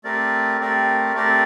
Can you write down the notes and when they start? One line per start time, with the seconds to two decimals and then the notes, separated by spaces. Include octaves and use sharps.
0.04 A3 C4 G4 A#4 D5
0.60 A3 C4 G4 A#4 D5
1.14 A3 C4 G4 A#4 D5